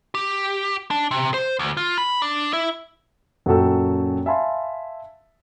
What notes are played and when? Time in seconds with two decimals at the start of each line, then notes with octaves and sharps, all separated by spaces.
0.14 G4
0.91 D4
1.11 C3
1.34 C5
1.59 D2
1.77 F4
1.98 B5
2.22 D4
2.53 E4
3.46 F#2 A#2 F#4 A4 G5 E6
4.26 E5 F5 G#5 A5 B5 C6